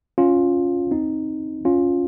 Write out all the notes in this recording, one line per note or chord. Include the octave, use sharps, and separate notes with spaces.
C#4 F4
C4 D#4
C#4 F4